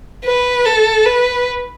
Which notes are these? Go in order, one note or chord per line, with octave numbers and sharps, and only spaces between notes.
B4
A4
B4